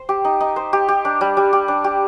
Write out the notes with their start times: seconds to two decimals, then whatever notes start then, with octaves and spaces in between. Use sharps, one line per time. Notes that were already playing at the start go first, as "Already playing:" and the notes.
Already playing: C5
0.09 G4
0.25 D#4
0.41 D#4
0.56 C5
0.73 G4
0.88 G4
1.05 D4
1.21 G3
1.37 G3
1.53 G4
1.68 D4
1.84 G4